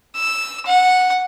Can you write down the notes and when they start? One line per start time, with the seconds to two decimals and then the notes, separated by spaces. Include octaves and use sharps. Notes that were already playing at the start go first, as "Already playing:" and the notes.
0.16 E6
0.66 F#5